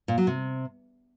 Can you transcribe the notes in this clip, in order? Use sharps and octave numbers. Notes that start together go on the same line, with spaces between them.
A#2
F#3
C3